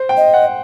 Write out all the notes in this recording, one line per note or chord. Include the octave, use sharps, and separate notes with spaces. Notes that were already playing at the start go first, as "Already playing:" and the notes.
Already playing: C5
G5
D#5
F#5